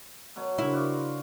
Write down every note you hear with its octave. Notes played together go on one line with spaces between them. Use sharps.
B2 F#3 C#5
C#3 D4 E4 A#4 C5
F#4 D5 F5